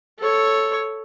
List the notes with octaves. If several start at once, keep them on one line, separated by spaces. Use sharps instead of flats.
A4 C#5